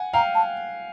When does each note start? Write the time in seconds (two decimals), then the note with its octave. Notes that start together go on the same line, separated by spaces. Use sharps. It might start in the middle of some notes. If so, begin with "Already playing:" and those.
Already playing: F#5 G#5
0.13 F5 G5 A#5
0.35 A5